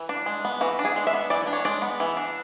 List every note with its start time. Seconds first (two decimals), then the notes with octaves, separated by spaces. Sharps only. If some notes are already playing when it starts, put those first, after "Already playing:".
Already playing: E3
0.09 D4
0.26 G#3
0.45 B3
0.61 E3 F#4
0.79 D4
0.85 G#4
0.96 G#3
1.07 E5
1.13 B3
1.30 E3 D5
1.47 D4
1.53 C#5
1.65 G#3 D5
1.82 B3
2.00 E3
2.17 D4